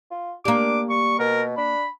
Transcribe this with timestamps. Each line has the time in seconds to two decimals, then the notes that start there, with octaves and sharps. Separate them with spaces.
0.10 F4
0.45 A#3 D4 G4 D6
0.90 G3 C#6
1.19 B2 A#4
1.57 D4 B5